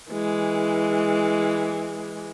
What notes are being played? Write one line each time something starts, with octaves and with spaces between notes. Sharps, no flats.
E3 G#3